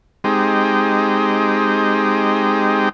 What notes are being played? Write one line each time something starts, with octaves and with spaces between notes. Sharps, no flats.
G#3 C4 D#4 G4